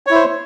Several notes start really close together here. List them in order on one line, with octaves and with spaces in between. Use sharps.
C#5 E4 C5